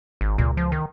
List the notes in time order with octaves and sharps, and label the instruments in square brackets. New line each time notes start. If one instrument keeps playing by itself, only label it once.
[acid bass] G#1
[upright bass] C#2 [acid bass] A#2
[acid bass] F3
D#3